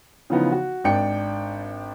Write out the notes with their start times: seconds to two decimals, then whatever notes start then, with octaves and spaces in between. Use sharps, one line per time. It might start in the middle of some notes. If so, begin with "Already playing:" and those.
0.30 C#3 E3 F3 B3 D#4
0.52 F#4
0.84 G#1 D4 G5 C#7